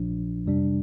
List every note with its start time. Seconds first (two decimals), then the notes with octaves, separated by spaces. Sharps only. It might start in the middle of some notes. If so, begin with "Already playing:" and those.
Already playing: A#1 A#2 F3 D4
0.46 F2 C3 G3 D4